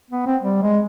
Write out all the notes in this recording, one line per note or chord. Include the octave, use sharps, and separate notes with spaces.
B3
C4
G3
G#3